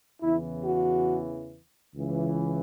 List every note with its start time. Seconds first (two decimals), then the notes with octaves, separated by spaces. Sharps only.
0.22 E2 C#3 E3 E4
0.64 F#4
1.94 C#2 C#3 E3